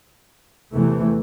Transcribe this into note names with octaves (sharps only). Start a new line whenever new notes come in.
E2 C3 E3 A3